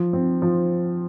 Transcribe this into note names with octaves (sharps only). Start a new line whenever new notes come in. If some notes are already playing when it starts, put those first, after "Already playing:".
Already playing: F3
C4
F3